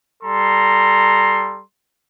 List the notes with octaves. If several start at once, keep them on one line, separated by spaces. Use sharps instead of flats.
G3 A4 A#5 C6